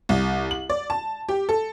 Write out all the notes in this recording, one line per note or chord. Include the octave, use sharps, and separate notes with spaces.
C2
F#7
D5
A5
G4
A4